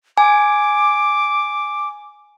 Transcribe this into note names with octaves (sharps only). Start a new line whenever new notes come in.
G#5 D6